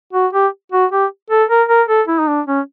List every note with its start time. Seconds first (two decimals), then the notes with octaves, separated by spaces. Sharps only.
0.13 F#4
0.33 G4
0.72 F#4
0.92 G4
1.30 A4
1.49 A#4
1.69 A#4
1.88 A4
2.08 E4
2.19 D#4
2.27 D4
2.47 C#4